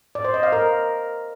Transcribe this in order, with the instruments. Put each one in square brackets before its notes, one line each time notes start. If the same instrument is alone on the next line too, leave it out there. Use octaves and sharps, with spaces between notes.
[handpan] D5
C5
D#5
F5
A#4